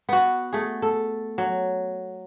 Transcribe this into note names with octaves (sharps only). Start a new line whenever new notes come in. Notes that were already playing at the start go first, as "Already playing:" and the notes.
B3 F#4
A3 G#4
A4
F#3